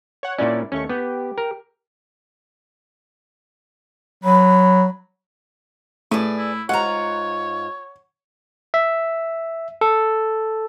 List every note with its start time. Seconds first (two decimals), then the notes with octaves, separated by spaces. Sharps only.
0.23 C#5 F#5
0.38 A#2 C#4 D4 E4 D5
0.72 D#2 A3 C#4 C#6
0.89 B3 G4
1.38 A#4
4.24 F#3 B5
6.11 A2 G#4 B4 D5
6.37 E4
6.69 G#2 F4 C#5 F#5 A#5
8.74 E5
9.81 A4